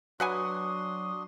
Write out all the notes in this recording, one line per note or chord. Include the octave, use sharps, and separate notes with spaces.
F#3 D4 F#4 B4 F#5 G#5 C6 D#6